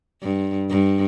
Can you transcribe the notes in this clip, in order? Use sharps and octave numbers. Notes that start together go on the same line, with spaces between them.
G2
G2